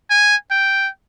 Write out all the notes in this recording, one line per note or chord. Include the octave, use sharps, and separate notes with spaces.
G#5
G5